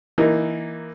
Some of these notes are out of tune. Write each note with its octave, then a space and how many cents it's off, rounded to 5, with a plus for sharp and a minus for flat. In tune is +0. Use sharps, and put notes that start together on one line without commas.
E3 +0 A#3 +5 D#4 -10